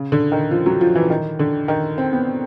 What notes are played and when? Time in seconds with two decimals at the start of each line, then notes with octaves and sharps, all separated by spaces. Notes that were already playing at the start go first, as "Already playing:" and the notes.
Already playing: C#3
0.12 D3
0.32 D#3
0.51 F3
0.66 F#3
0.81 F3
0.95 E3
1.10 D#3
1.39 D3
1.68 D#3
1.98 C4
2.13 B3